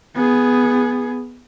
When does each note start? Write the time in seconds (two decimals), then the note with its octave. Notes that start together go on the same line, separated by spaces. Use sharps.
0.15 B3 G#4